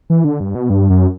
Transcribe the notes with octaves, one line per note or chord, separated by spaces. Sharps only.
E3
D3
G2
B2
G2
F#2